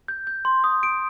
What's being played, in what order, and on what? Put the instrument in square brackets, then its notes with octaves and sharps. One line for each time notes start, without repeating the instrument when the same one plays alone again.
[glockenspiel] G6
G6
C6
D#6
D7